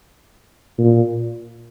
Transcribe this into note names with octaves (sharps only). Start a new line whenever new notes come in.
A#2